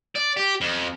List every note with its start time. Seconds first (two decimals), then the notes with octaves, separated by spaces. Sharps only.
0.16 D5
0.37 G4
0.61 F2